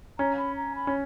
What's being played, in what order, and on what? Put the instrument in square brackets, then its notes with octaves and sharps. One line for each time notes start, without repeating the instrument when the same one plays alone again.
[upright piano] C#4 [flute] A#5
[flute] B5
A#5
B5
[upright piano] C#4